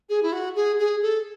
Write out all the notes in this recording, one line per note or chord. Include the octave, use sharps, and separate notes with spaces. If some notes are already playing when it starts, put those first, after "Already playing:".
G#4
E4
F#4
G#4
G#4
A4